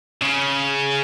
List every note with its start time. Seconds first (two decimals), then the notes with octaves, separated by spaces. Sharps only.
0.22 C#3